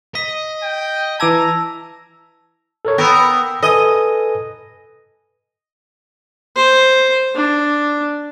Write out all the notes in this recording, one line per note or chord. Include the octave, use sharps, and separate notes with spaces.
D#5 B6
G5
E3 A5 A#5 D6 E6 G#6
A4 A#4 C#5
B3 A#4 G5 E6
A4 B4 D#5 G#5
C5
D4